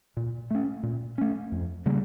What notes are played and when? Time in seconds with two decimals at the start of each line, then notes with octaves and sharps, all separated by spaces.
0.17 A#2
0.50 A3 C#4
0.83 A#2
1.18 A3 C#4
1.52 F2
1.86 C#3 G3 A#3